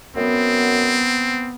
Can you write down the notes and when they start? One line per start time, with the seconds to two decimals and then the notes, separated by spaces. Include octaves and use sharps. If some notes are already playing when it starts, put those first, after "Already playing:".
0.16 F#2 B3 C4